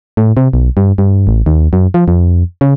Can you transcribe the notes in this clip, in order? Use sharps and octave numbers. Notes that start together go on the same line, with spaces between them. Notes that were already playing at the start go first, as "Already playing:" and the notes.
A2
C3
B1
G2
G2
A1
D#2
F#2
F3
F2
C#3